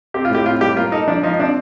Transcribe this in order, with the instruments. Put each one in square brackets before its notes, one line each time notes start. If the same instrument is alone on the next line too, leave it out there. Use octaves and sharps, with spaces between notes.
[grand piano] C4 [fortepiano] G4
[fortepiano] F4
[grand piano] A2 [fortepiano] G4
[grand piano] C4 [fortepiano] F4
[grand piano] G3 [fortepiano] G4
[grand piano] A#3 [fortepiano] F4
[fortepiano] D#4 [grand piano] A4
[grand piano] F3 [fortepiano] D4
[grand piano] F3 [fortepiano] D#4
[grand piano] C4 [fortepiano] D4